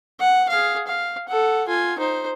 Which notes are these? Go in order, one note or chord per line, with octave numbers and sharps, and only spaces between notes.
F#5
G#4 F5
F5
A4 F#5
F4 G#5
D#4 C5